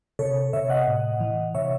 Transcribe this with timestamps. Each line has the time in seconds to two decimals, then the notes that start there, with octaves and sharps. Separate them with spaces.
0.19 C3 A4 C#5
0.53 C3 C#5 E5
0.70 D#5 F#5
0.87 A2
1.20 E3
1.55 C3 C#5 E5